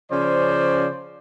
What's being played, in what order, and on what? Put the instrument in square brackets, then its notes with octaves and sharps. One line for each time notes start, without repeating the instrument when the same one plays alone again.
[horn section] C#3 F3 C#4 C5 D5